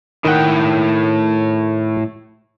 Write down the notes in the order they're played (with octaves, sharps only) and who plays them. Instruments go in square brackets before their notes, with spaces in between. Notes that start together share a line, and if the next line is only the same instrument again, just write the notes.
[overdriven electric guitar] A2 G5 [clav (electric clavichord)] D#3 F#5